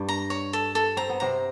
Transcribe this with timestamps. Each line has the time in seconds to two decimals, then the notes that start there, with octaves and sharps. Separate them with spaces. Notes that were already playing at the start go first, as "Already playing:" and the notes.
Already playing: G2 G3
0.09 A#5
0.30 C#5
0.53 A4
0.75 A4
0.97 C4 A#5
1.10 B3
1.20 C3 C4 A#5